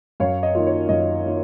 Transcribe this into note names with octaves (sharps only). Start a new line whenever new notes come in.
F#2 C#5 F5
D#5
D#3 A#3 F4
C#5
F#2 D#5
D#3 A#3 F4